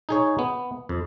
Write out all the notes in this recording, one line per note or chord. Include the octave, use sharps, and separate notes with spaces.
D#4 G#4 C#5
B3
F2